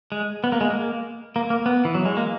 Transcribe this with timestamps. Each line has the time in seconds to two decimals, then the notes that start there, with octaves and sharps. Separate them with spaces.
0.12 G#3
0.44 B3
0.52 A#3
0.61 G#3
0.71 A#3
1.36 A#3
1.50 A#3
1.66 B3
1.85 E3
1.95 F#3
2.06 G#3
2.17 A#3